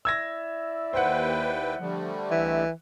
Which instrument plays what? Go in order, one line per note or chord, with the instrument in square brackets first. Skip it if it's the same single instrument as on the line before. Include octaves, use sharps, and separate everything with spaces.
[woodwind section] E4 D5 E5 [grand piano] E6 G#6 A#6
[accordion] D#2 B4 G5 [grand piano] C5 F#5
[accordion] D3 G3 A3 [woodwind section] F3
[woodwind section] C2 D#5 E5 [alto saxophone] E3